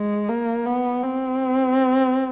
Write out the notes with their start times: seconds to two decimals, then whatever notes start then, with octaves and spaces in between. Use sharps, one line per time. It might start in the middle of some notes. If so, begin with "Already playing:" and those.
Already playing: G#3
0.29 A#3
0.66 B3
1.03 C4